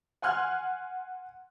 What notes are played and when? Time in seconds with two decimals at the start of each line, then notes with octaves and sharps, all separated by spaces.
0.22 F#5 G#5 C6 F6 F#6 G#6